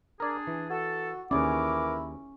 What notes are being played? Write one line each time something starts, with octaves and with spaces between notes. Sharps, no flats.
D4 G#4 A#4 D5
E3
F#4 A4
D#2 E3 C#4 E4 G#4 A#4 D5 D6